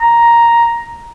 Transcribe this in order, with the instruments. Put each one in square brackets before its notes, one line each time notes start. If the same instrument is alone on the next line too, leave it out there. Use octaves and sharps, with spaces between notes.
[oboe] A#5